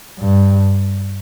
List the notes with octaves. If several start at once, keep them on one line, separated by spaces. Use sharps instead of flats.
G2